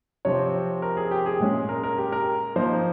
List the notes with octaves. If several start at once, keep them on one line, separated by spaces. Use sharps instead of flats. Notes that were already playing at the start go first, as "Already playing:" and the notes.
C3 F3 C4 C#5
A#4
G#4
G4
G#4
A#2 G#3 C#4
A#4
A#4
G4
A#4
F3 A#3 D#4 C5